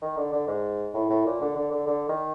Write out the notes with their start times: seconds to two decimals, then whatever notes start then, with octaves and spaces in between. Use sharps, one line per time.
0.02 D#3
0.17 D3
0.32 D3
0.47 G#2
0.94 A2
1.10 A2
1.25 A#2
1.41 D3
1.55 D3
1.71 D3
1.87 D3
2.09 D#3